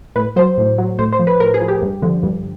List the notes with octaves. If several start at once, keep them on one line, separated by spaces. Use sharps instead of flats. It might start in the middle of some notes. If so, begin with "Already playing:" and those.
A2 B4
F#3 C5
A2
F#3
A2 C5
C5
F3
B4
A2 A#4
G#4
F3
G4
G2
D3 F3
G2